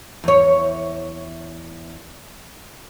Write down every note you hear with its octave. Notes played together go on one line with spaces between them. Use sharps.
E2 C#5